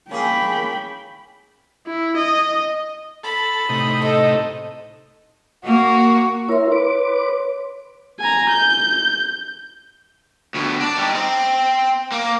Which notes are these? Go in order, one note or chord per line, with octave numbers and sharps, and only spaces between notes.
A#3 C#4 G#4 G5 B5
E4
D#5
A4 B5
A2 C3 D#4
A4 D#5
A#3 F#4
E4 A#4 C#5 C6
B4 D6
G#5 A#5
G6
D2 B2
D4
G3 D#4
C4
A#3